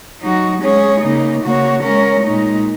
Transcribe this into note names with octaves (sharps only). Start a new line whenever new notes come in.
F#3 D#4 F#4
G#3 C#4 G#4 C#5
C#3 A#3 D#4
C#3 A#3 F#4 C#5
G#3 C#4 A#4 C#5
A#2 G#3 D#4